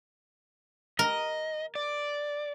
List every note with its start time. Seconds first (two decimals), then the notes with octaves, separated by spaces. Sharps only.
0.99 A#4 D#5
1.75 D5